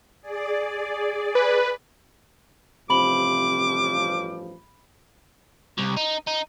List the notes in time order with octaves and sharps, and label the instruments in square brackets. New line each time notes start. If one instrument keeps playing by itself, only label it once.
[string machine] G#4 D5
[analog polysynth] B4
[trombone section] A1 G2 F3 [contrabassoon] C3 [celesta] B5 F#7 [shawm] D6
[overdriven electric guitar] C2
D#4
D#4